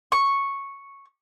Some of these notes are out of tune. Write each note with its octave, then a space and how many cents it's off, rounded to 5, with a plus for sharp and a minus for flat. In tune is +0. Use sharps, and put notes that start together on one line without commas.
C#6 -5